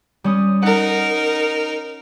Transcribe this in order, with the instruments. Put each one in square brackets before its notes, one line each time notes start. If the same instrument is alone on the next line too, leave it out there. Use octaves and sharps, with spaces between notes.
[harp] G3 C#4 D#6
[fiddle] D#4 A#4 [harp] F#5